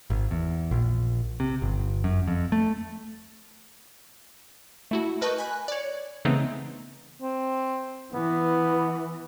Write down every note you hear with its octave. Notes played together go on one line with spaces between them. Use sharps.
G#1
E2
A#1
C3
G1
F#2
F2
A3
A3 E4 F#4
A#4 B4 D#5 A5 C#6 G6
G#5 B5 F#6
C#5 D5
C#3 E3 A3 B3 C4 D#4
C4
E3 B3